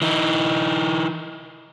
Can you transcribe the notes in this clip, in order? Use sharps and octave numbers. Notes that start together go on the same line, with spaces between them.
E3 D#4